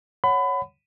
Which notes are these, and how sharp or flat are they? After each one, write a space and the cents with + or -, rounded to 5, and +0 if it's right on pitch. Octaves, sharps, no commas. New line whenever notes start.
C#5 +0 F#5 +0 B5 +25